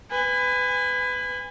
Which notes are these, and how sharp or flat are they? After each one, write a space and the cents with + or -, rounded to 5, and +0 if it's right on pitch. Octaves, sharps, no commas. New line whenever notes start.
B4 +20 G#5 -30